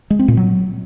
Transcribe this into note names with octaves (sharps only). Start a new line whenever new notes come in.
G#3
C4
A#2
F#3